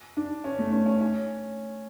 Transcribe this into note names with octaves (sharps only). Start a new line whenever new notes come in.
D4
C#4
A3
C#4
C#4
C#4